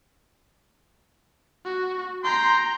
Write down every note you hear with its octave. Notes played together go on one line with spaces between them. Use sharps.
F#4
G5 A#5 C6